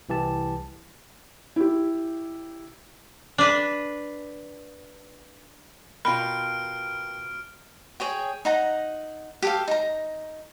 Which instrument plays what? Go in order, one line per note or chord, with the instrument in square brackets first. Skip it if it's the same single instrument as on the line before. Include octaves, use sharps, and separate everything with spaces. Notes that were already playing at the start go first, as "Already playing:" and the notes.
[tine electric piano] C2 E3 G4 A5
[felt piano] E4 G4
[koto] D4 B4
[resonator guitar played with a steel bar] B2 F4 [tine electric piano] A#4 G5 A#5 [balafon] B5 [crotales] F6 D7
[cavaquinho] G#4 C#5 G5
D#4 F#5 A#5
G4 A4 F5
D#4 A#5